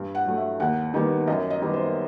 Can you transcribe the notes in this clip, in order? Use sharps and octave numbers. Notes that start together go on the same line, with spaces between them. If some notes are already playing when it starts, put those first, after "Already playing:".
Already playing: G2
F#5
F#3 A3
E5
D#2 F#5
D#3 G3 B3
F#2 D#5
D#5
D#3 G3 B3
C5